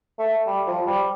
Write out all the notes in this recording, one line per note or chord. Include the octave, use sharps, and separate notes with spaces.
A3
G3
F3
G3